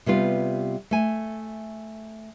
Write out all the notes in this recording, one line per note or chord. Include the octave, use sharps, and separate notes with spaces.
C3 G3 B3 F4
A3 G#5